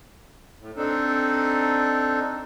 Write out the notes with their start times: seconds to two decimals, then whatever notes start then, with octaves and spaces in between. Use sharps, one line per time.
0.61 A2
0.77 C4 D4 D#4 A4